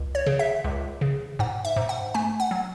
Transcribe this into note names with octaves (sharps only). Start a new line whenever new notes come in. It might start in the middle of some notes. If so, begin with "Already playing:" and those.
Already playing: C#2
C#5
C#3
E5
C#2
C#3
G#2 F#5
E5
G#2
F#5
A3 G#5
F#5
F#3